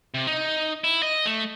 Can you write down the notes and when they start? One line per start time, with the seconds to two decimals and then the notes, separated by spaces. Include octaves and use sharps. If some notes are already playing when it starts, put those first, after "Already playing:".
0.14 C3
0.27 D#4
0.84 E4
1.03 D#5
1.26 A3